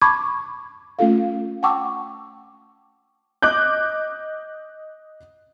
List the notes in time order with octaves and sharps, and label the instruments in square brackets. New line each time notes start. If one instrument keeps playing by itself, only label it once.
[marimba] A5 B5 C#6 D6 G#6
A3 C#4 F4 A4 F5
F#5 G5 A5 C#6 D6 E6
[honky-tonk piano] D#5 D6 F#6 G6